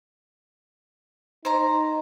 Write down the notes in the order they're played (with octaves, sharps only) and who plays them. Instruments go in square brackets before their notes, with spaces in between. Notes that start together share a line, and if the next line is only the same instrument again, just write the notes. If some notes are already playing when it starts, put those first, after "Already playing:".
[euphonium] D#4 [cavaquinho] C5 A#5